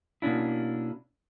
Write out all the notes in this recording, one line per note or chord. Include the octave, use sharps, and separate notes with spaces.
B2 A#3 C#4 D4 E4